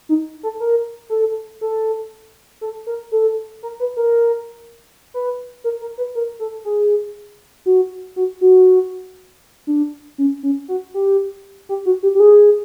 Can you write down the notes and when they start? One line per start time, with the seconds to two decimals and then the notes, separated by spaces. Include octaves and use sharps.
0.09 D#4
0.43 A4
0.60 A#4
1.10 A4
1.61 A4
2.61 A4
2.87 A#4
3.12 A4
3.63 A#4
3.80 B4
3.97 A#4
5.14 B4
5.64 A#4
5.81 A#4
5.98 B4
6.15 A#4
6.40 A4
6.65 G#4
7.66 F#4
8.16 F#4
8.41 F#4
9.67 D4
10.18 C#4
10.43 C#4
10.68 F#4
10.94 G4
11.69 G4
11.86 F#4
12.03 G4
12.15 G4
12.20 G#4